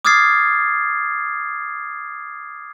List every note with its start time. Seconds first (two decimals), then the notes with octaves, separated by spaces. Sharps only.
0.05 D6 D#6 F6 G#6 A6 C7